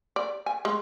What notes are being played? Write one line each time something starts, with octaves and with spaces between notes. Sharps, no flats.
D5
G#5
G#3